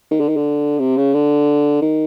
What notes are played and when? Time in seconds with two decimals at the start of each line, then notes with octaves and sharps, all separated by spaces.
0.11 D#3
0.20 D3
0.28 D#3
0.36 D3
0.79 C3
0.97 C#3
1.13 D3
1.81 D#3